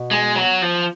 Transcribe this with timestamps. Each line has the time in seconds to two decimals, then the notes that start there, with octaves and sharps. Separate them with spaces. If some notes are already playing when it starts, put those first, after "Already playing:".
Already playing: B2
0.11 G#3
0.36 F#3
0.62 F3